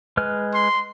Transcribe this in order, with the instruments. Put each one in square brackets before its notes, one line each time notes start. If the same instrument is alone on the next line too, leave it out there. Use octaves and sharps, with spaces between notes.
[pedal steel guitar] G#3 B4 F6
[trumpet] C6